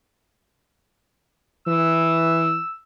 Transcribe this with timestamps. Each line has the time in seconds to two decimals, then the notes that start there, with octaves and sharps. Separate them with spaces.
1.67 E3 E6